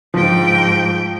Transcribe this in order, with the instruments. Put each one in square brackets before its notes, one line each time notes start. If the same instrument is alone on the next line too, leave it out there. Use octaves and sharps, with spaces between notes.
[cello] G#2 G5 [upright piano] F3